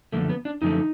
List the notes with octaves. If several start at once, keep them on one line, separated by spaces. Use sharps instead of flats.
F#2 D3 F3 A3 A#3
B3
D4
F#2 D3 F3 A3 D#4